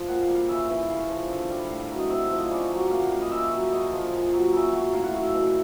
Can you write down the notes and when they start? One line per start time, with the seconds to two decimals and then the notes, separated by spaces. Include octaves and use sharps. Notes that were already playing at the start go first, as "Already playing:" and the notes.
Already playing: F3
0.09 A#2 F#5
0.22 F5
0.28 G3
0.35 F5
0.48 C#3 E5
0.69 E3
0.89 C#3 F5
1.09 F3
1.29 D3
1.49 G3
1.70 A2 F5
1.90 F#3
1.99 D#5
2.10 C3 E5
2.24 E5
2.30 F3
2.37 D#5
2.50 C#3 D5
2.71 F#3
2.91 A#2 F5
3.02 F#5
3.11 G3 F5
3.22 D#5
3.32 C#3 E5
3.52 F#3
3.72 C#3 D#5
3.92 F3
4.12 A#2
4.33 F#3
4.53 C#3 E5
4.73 F#3
4.93 A2 F5
5.04 F#5
5.13 F#3 F5
5.23 E5
5.34 B2